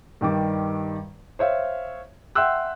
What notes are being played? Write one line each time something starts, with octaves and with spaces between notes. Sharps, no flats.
G2 D#3 G3 D6
C5 C#5 E5 F5
E5 F#5 G5 C6 E6 F#6